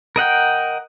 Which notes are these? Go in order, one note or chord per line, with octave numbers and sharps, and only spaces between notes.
A#4 D#5 F#5 G5